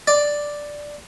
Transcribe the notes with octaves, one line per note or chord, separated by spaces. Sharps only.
D5